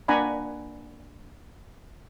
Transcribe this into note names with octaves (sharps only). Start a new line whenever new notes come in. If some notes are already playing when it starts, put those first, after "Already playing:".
A#3 D4 F#5 G#5 A#5 B5